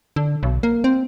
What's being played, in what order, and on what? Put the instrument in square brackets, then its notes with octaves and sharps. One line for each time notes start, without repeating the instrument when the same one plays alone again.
[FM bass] D3
B1
A#3
C4